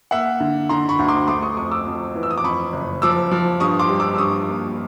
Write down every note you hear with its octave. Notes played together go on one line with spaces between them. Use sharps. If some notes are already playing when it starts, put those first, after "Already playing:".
A#3 E5 F#5
D3
D3 A#5 C6
B5 C#6
D2
C6 D6
A3 C6 D6
C#6 D#6
F2 C#6 D#6
D6 E6
F2
E3
E6
D#6
D6
F2 B5 C#6
F#1
F3 D6 E6
F3
G2 C#6 D#6
C6 D6
G3
D6 E6
E6
G2 C#6 D#6
A#3